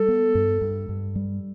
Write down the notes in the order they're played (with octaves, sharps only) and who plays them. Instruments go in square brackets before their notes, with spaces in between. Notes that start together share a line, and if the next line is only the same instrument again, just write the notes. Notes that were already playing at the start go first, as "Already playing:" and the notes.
Already playing: [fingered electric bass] G3 [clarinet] A4
[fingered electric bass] B3
G2
G2
G2
G3